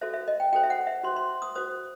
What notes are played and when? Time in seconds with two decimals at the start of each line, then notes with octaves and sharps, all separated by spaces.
0.01 F#4 A4 C5 E5
0.14 E5
0.28 D#5
0.40 G5
0.53 F#4 A4 C5 G5
0.63 E5
0.70 F#5
0.87 E5
1.03 F#4 C5 C6
1.16 C6
1.42 D#6
1.55 F#4 C5 D#6